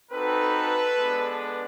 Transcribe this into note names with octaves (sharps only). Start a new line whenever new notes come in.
C4 D#4 F#4 A4 B4
G#3 B3 D4